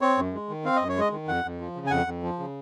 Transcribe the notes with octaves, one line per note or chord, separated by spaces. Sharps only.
C4 C#5
F#2
G#3
D#3
C4 F5
D#5
F#2
C#5
G#3 D#5
D#3
F2 F#5
F2
F3
C#3
G#5
F2 F#5
F2
F3
C#3